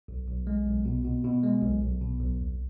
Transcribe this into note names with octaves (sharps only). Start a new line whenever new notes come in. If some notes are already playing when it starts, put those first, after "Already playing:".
B1
B1
G#3
B1
B2
B2
B2
G#3
B1
B1
B2
B1
D#2